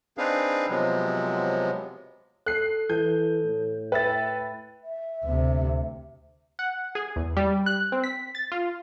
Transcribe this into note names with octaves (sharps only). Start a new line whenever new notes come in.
C4 D4 D#4 G#4 B4 F5
C3 F3 F#3 G#3 B3
A4 F#6 C7
E3 A4 G6
A2
B4 E5 G5 A6
E5
D2 C3
F#5
G#4
E2
G3
F#6
C4
B6
A6
F4